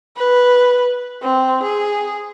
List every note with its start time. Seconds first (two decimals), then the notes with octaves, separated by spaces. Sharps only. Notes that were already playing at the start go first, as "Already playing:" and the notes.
0.17 B4
1.22 C4
1.63 G#4